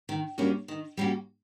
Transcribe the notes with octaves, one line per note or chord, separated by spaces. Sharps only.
D#3
G3 A#3 C#4 F#4
D#3
G3 A#3 C#4 F#4